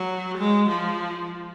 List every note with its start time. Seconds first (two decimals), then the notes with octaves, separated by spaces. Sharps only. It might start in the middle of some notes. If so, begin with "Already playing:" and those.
Already playing: F#3
0.38 G#3
0.70 F3